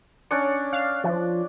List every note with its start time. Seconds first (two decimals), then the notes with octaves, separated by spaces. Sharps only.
0.31 C#4 D4 D5 C#7
0.73 F5
1.04 F3